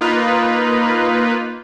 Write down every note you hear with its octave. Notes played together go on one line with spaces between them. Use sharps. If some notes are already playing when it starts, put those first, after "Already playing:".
A#3 D#4 F4 B4